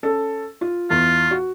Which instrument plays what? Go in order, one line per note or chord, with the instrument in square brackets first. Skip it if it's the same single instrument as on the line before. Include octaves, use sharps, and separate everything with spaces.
[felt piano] C#4 A4
F4
[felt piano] E2 [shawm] F4
[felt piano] F#4